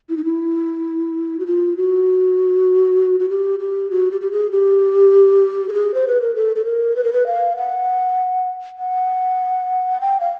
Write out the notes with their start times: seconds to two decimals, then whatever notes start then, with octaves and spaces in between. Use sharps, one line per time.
0.09 E4
0.17 D#4
0.25 E4
1.39 F#4
1.46 F4
1.77 F#4
3.20 F#4
3.29 G4
3.59 G4
3.90 F#4
4.11 G4
4.21 G4
4.32 G#4
4.51 G4
5.69 A4
5.73 G#4
5.94 C5
6.07 B4
6.21 A#4
6.35 A4
6.56 A4
6.65 A#4
6.96 B4
7.04 A#4
7.13 B4
7.26 F5
7.57 F#5
8.78 F#5
10.01 G5
10.20 F5